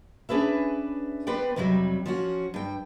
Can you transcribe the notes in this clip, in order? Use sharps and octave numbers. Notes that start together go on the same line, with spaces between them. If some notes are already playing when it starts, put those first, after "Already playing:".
C#4 D4 G#4 B4 E5
B3 B4 C5 D5 G5
F2 C3 F#3 G3
F3 C#4 F#4
G2 G5